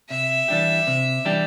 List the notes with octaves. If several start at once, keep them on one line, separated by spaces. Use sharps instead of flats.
C3 E5
E3 G3 D4 G4
C3
E3 G3 D4 G4